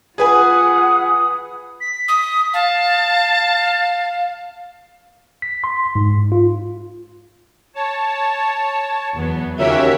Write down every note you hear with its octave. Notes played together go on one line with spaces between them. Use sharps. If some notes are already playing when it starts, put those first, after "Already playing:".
F4 G#4 B4 F#5 G#5 D#6
B6
D#6
F5 A5
B6
C6
G#2
F4
C#5 A5
E2 F#3 B3
D#2 C#3 C#4 F#4 G4 A#4 C#5 E5